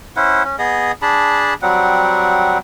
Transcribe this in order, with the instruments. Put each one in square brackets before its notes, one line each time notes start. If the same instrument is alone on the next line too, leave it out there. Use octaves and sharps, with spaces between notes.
[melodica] C#4 E4 C5 F#5
C#4
B3 G#4 D#5
D4 G#4 A5 B5
F#3 G3 C4 F#5